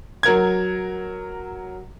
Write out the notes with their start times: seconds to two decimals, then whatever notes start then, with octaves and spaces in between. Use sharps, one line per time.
0.23 F#3 A#4 G#6